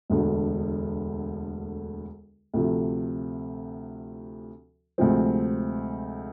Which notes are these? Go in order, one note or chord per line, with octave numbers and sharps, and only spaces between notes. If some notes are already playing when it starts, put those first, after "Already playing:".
E1 D2 D3 A3
D2 C3 F3 A3
D2 C3 F3 G#3 C4